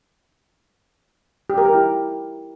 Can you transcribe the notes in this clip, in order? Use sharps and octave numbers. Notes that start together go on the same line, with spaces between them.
G4
A#4
G4
E4